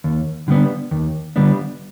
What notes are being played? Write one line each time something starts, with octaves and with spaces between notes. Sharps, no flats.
D#2
D3 G3 B3 D4
D#2
D3 G3 B3 D4